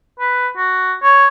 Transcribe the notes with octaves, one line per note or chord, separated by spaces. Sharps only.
B4
F#4
C#5